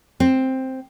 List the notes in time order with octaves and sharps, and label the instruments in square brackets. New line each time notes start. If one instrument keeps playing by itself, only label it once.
[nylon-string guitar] C4